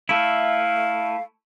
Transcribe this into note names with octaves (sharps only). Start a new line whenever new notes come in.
A3 E4 F5